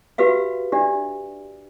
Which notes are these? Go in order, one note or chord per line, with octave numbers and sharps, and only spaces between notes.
F#4 G4 B4 E5 F5
D4 G4 D5 E5